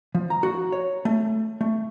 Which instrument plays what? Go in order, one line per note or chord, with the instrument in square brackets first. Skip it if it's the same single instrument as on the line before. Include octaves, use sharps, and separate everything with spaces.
[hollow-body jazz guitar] F3
A#5
F#4
C#5
A3
A3